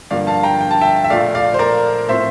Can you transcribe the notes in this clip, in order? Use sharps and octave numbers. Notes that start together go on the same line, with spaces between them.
G2 D3 F3 A#3 D5 F5
F5 A5
G5 A#5
G5
A5
E5 G5
E5
A#1 A#2 A3 D5 F5
D5 F5
C5
A#4 D5
A2 F3 C4 C5 E5